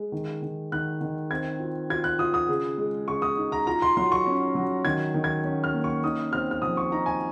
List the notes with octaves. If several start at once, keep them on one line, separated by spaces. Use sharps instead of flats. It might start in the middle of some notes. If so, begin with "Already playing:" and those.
Already playing: G#3
D#3
D#3
D#3 F#6
D#3
C4 G#6
F4
F4 G#6
F#6
F4 D#6
D#6
C#3
G#3
C#3 C#6
D#6
D#4
A#5
F4 A#5
C6
F#3 C6
C#6
C#4
F#3
D#3 G#6
D#3
G#6
C#4
F6
A#3
C#6
D#4 D#6
C4 F6
F6
F3 D#6
C#6
D#4 A#5
G#5